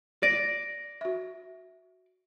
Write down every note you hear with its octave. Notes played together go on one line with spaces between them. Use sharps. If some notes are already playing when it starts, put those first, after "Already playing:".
D5 A#6 D7 D#7
F#4 E5